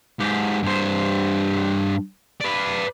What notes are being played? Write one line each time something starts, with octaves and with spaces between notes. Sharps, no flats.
G#2 G4
G2 C5
B4 D5